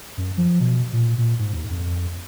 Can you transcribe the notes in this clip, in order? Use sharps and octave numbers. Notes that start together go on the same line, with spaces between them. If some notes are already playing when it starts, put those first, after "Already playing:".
F#2
F3
B2
A#2
A#2
G#2
D#2
F2